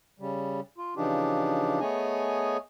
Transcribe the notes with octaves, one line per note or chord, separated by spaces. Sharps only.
C#3 G3
F4
C#3 E3 F3 D4 D#4 G4
A3 B3 G#4 C#5 D#5 G#5